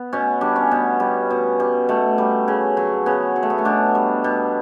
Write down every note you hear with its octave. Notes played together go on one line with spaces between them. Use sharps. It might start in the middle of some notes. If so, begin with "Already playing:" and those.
Already playing: B3
B2 C#4
G3 D4
C#4
B2 B3
G3
B2
G3
B2 A3
G3
C#3
F#3
C#3 B3
F#3
A3
B3
C#4
B2 D4
G3
B2